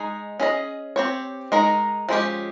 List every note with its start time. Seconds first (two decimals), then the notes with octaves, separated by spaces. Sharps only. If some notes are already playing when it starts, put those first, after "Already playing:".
Already playing: G#3 D#4 G#4
0.40 C#4 G#4 D#5
0.96 C4 G4 C#5
1.52 G#3 D#4 A#4 D#5
2.09 F3 G#3 C#4 G4